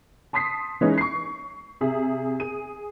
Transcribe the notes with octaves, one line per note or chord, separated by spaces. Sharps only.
A5 C6 D#6 B6 C7
E3 G#3 C#4 D#4
C#6 C7
C3 G#4 E5
G#4 D#7